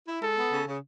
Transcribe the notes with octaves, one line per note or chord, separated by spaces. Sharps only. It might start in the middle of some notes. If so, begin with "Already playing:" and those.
E4
G#3 A4
B3
C#3
C#3